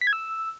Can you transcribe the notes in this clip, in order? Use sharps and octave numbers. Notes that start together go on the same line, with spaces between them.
B6
G#6
E6